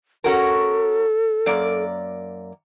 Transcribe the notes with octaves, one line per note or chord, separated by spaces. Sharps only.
C#4 F#4 A4 A#4
F#2 A#3 D5